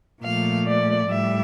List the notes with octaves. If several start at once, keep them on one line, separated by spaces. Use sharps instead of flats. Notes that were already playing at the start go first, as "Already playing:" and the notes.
A#2 F3 A3 F5
D5
A2 G3 E5